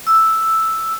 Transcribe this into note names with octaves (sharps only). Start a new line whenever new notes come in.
E6